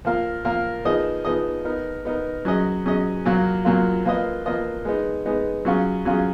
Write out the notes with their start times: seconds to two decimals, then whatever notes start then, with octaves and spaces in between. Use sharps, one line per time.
0.05 F3 A#3 F4 A#4 F5
0.45 F3 A#3 F4 A#4 F5
0.85 F3 B3 D#4 G#4 D#5
1.25 F3 B3 D#4 G#4 D#5
1.65 B3 D#4 A#4
2.05 B3 D#4 A#4
2.45 F#3 C#4 G#4 D#5
2.86 F#3 C#4 G#4 D#5
3.25 A#2 F#3 A#3 F4
3.65 A#2 F#3 A#3 F4
4.05 F3 A#3 F4 B4 D#5
4.46 F3 A#3 F4 B4 D#5
4.85 G#3 B3 D#4
5.26 G#3 B3 D#4
5.65 F#3 C#4 F4 G#4
6.05 F#3 C#4 F4 G#4